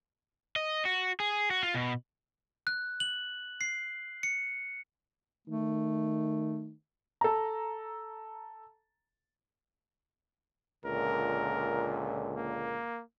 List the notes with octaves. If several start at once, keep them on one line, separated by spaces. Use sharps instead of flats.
D#5
F#4
G#4
F#4
F4
B2
F#6
F#7
C7
C#7
D#3 A3
A4 A#5
C#2 A#2 D3 A#4
A#3